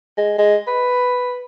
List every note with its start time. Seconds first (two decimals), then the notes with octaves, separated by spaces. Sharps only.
0.18 G#3
0.38 G#3
0.67 B4